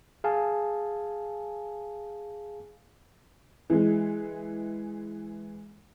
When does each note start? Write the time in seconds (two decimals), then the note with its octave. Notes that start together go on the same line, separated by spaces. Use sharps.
0.24 G#4 F5 G#5 A5
3.70 E3 G#3